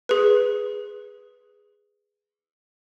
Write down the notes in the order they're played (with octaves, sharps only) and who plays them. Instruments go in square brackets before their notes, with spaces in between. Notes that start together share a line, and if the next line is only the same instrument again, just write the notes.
[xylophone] G#4 B4